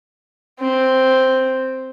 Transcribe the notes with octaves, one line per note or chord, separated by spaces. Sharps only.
C4